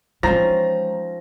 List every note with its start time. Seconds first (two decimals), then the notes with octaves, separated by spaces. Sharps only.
0.23 E3 F3 G#3 C4 C#4 D#4 A#5 A#6